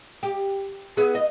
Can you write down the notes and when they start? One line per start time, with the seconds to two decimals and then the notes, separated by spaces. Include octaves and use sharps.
0.23 G4
0.97 B3 E4 G#4
1.15 D#5